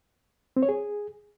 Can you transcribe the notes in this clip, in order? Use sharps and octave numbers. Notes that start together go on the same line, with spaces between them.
C4
C#5
G#4